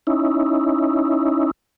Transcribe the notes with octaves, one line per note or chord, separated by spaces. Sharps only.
C#4 D#4 E4